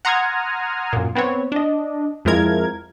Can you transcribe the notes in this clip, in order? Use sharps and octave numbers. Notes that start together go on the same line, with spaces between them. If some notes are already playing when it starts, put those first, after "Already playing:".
F#5 A#5 C6 D#6 F6 G#6
F#2 A#2
B3 C4 B4 C#5
D4 D#5
F2 F3 G#3 E4 A#4 G#6